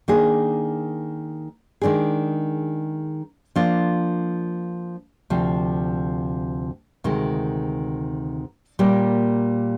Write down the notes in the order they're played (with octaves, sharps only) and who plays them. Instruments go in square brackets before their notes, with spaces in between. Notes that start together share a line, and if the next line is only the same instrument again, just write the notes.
[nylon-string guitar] D#3 A#3 D4 G#4
D#3 G#3 D4 G#4
F3 A#3 D4 F4
D2 C3 F3
D2 C3 D#3 G#3
A#2 G3 A#3